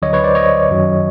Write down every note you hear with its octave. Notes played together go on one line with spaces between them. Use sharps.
D2 D3 F#3 C#5 D#5
B4 C#5
C5 D5
C#5 D#5
F#2 D#3 F#3